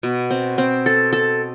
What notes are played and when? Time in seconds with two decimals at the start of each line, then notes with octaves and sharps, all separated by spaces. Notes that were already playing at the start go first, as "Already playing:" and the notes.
0.03 B2
0.31 C4
0.58 C4
0.86 A4
1.13 A4